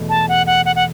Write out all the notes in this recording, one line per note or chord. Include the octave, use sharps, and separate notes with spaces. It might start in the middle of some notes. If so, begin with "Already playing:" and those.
Already playing: E2 B2 A3
A5
F#5
F#5
F#5
F#5